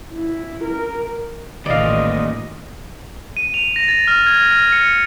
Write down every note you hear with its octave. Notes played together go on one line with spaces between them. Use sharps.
E4
A#4
A1 D#2 A#2 D5 D#5 F5
D#7
F7
A#6
A6
F6
G#6
F6
C#7